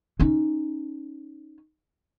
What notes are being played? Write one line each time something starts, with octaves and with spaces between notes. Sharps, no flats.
C#4 D#4